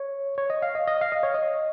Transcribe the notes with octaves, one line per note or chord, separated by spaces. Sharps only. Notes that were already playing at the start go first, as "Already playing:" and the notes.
Already playing: C#5
C#5
D#5
F5
D#5
D#5
F5
D#5
C#5
D#5